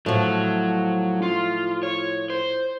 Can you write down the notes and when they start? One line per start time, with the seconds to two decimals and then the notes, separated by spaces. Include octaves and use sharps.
0.06 A2 F3 F#3
1.23 F4
1.83 C#5
2.30 C5